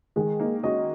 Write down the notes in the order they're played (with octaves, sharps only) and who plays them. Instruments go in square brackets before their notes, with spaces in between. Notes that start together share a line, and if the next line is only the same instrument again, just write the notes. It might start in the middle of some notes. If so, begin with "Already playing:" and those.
[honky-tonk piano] D#3 [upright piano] G#3
[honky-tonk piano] A#3 D#4
[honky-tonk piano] G#3 C#4 [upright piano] F#4 D#5